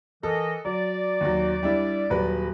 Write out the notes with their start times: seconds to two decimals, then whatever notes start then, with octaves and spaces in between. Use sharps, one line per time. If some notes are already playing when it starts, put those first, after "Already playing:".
0.23 E3 A4 A#4 D#5
0.65 F#3 D5
1.21 D#2 F#3
1.63 G3 D4 E4
2.10 D#1 F#3 B4